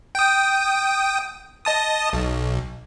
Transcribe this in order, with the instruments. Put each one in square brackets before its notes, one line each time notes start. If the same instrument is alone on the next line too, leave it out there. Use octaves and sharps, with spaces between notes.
[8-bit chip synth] G5 D#6
D#5 A5 D#6
B1